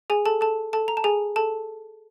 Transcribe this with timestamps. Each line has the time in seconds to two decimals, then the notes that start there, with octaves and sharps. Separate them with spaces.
0.10 G#4 G#5
0.26 A4 A5
0.41 A4 A5
0.73 A4 A5
0.88 A#5
0.97 A5
1.04 G#4 G#5
1.36 A4 A5